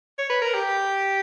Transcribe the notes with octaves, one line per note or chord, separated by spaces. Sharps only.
C#5
B4
A#4
G4